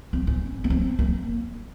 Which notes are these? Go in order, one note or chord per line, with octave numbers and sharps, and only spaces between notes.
C4
C#4
A#3
C4
A#3